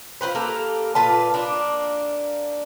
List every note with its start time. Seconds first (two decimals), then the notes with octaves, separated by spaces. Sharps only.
0.21 F4 G#4 B4 C5
0.35 A#3 G4 A4 A#4
0.95 A#2 F4 B4 A5
1.34 A#3 D4